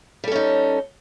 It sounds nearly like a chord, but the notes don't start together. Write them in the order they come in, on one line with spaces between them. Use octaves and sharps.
G3 A4 C#4 D#4